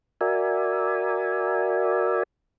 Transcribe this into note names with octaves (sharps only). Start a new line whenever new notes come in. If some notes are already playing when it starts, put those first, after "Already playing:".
F#4 A#4 D5 E5 G#5